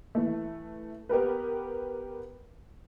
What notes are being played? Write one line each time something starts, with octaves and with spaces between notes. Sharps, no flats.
E3 A3
B3 G4 A#4 B4